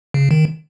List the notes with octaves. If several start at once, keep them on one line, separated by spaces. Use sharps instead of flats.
C#3
D#3